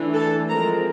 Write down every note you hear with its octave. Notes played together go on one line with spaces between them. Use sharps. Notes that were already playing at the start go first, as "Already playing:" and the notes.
Already playing: E3 A3 D4
A4 A5
F3 G#3 C4 A#4 A#5